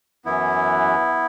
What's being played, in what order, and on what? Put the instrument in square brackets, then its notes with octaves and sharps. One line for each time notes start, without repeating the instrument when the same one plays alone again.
[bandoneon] F#2 E3 B3 E4